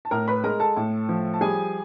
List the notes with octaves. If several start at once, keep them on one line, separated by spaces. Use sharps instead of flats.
A5
A2 A#4 A#5
B4 B5
G#3 A#4 A#5
A4 A5
A2
F3
A5
G3 G#4 G#5